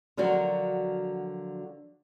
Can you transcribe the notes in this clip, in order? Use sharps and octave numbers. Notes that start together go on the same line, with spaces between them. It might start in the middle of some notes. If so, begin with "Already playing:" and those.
D3 F3 F#3 D4 F#4 A#4